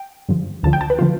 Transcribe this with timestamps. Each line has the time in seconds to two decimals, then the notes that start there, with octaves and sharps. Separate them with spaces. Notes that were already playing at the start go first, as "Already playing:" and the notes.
Already playing: G5
0.29 G2 D3 F3
0.63 D2 D3 F3 A5
0.73 G5
0.81 A5
0.90 B4
0.99 D3 F3 F4